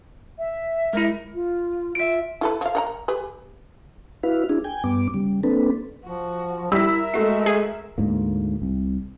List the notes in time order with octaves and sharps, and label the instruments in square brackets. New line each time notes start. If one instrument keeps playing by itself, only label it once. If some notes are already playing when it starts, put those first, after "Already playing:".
[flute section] E5
[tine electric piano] G#3 E4 [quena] A#4
[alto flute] F4
[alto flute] F4 [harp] E5 D7
[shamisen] E4 A4 B4
F3 F5
A#4 F#5 A#5
G4 G#4 B4
[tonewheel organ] E4 F#4 B4 F5
D4 E4 G#4
G5 G#5
G2 B3 D6
C#3 G3
A#3 C4 D4 A4 B4
[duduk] F3 [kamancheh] F#4
[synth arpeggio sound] G3 [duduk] E4 [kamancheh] A#4 E5 [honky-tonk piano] E6 B6
[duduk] G#3 [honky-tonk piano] A3 F#4 [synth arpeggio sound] C7
[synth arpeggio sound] G#4
[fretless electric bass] D2 G#2 A#3
C2